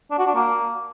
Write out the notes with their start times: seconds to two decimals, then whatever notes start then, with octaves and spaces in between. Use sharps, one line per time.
0.10 D4
0.18 F#4
0.26 D4
0.34 A#3